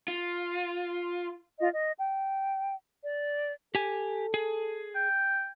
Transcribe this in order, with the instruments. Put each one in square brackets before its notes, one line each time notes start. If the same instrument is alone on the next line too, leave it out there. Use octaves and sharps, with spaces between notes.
[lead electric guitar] F4
[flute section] F4 D#5
D#5
G5
D5
[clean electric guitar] G4 G#5 [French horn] A4
[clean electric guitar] G#4
[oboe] G5